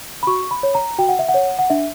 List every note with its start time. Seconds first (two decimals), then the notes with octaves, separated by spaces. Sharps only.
0.23 B5
0.27 F#4 C#6
0.51 B5
0.63 C#5
0.75 A#5
0.99 F#4 G5
1.09 F#5
1.19 E5
1.29 F#5
1.34 C#5
1.59 F#5
1.70 D4 E5